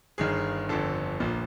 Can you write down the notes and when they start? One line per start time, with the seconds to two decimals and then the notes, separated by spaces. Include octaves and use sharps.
0.18 G1 G2 D#3 G#4
0.69 G1 F2 D3 A4
1.20 A#1 A#2